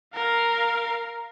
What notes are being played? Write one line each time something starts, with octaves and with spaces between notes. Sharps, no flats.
A#4 F5